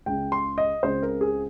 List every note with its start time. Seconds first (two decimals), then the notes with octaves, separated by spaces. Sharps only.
0.06 C#2 C#3 G#3 G5
0.32 C6
0.58 D#5
0.83 C#2 C#3 G#3 C4 C5
1.03 A#4
1.21 G#4